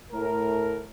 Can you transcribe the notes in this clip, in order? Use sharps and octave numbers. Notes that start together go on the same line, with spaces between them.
A2 A#4